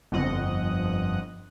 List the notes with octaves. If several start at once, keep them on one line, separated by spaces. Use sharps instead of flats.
G1 F2 D#5 F#5